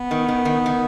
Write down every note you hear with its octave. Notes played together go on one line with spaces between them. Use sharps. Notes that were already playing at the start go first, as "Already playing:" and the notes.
Already playing: B3
D#3
D#3
D#3
D#3